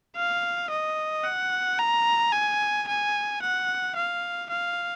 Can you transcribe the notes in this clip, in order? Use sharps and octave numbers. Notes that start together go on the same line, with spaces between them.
F5
D#5
F#5
A#5
G#5
G#5
F#5
F5
F5